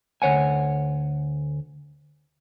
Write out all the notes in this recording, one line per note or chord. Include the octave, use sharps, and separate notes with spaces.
D2 C#5 F#5 G#5